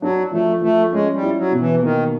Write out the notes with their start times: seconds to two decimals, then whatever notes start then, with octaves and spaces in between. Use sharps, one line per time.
0.02 F#3 D4
0.32 F3 A3
0.62 F3 A3
0.92 G#3 C#4
1.14 G3
1.22 E4
1.37 F#3
1.52 B2
1.60 E3
1.82 D#3 A#3